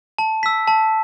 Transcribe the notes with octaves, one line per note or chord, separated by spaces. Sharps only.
A5
E6 B6
A5